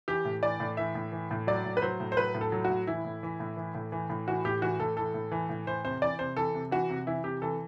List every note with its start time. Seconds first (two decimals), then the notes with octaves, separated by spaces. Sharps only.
0.08 E3 G4
0.25 A2
0.43 E3 D5
0.60 A2
0.77 E3 E5
0.95 A2
1.12 E3
1.31 A2
1.47 F#3 D5
1.65 A2
1.77 B4
1.82 F#3 C5
2.00 A2
2.12 C5
2.17 F#3 B4
2.35 A2
2.41 A4
2.52 F#3
2.65 F#4
2.70 A2
2.87 E3 E4
3.05 A2
3.23 E3
3.40 A2
3.57 E3
3.75 A2
3.92 E3
4.10 A2
4.28 E3 F#4
4.45 A2 G4
4.62 E3 F#4
4.80 A2 A4
4.97 E3 A4
5.14 A2
5.31 E3
5.49 A2
5.67 E3 C5
5.84 C3 C5
6.02 E3 D5
6.19 C3 C5
6.37 E3 A4
6.55 C3
6.71 E3 F#4
6.90 C3
7.07 E3 E4
7.24 C3 G4
7.42 E3 A4